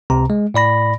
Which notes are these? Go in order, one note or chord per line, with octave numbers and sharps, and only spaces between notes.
C#2 C3 A#5
G#3
A2 D5 B5 A#6